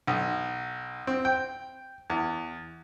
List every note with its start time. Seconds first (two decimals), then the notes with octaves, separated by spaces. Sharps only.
0.07 B1
1.07 C4
1.25 G5
2.10 E2